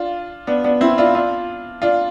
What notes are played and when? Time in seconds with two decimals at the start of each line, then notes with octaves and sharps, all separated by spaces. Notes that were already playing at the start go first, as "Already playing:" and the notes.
Already playing: D4 F4
0.47 B3 D4
0.64 B3 D4
0.81 C4 E4
0.98 D4 F4
1.15 D4 F4
1.82 D4 F4